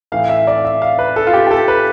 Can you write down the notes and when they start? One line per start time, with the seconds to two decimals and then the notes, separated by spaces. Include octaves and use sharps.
0.12 A2 E3 F5
0.29 E5
0.47 D5
0.65 E5
0.82 F5
0.99 B4
1.16 A4
1.27 F4
1.33 G4
1.47 G4
1.51 A4
1.68 B4